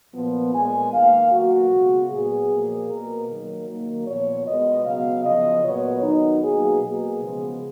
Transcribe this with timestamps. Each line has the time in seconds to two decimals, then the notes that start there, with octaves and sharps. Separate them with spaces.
0.14 A#2 F3 B3
0.54 A#2 G#3 B3 G#5
0.93 D#3 A#3 F5
1.32 B2 F#3 A#3 F#4
1.71 C#3 G#3 B3
2.10 A#2 F#3 B3 G#4
2.50 A#2 F3 A#3
2.89 B2 A#3 A#4
3.29 D#3 F#3 A#3
3.68 D#3 F#3 A#3
4.07 A#2 F3 B3 C#5
4.47 B2 G#3 B3 D#5
4.86 C#3 F#3 B3 F5
5.25 C#3 F3 B3 D#5
5.64 A#2 F#3 B3 C#5
6.03 D#3 F#3 B3 D#4
6.43 B2 F#3 A#3 G#4
6.83 B2 F#3 A#3 G#4
7.21 C#3 F3 G#3 B3